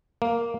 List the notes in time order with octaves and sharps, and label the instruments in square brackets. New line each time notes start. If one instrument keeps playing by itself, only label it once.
[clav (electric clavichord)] A#3